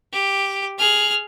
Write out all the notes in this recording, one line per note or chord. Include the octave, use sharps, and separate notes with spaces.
G4
G#4 F6